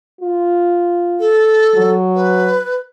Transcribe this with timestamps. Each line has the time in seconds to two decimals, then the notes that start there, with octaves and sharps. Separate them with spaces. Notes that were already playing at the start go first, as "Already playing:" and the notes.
0.21 F4
1.19 A4
1.75 F#3
2.15 B4